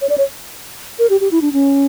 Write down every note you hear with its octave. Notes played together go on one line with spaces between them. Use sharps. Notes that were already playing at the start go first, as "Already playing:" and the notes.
C#5
D5
C#5
A#4
G4
G4
E4
D4
C#4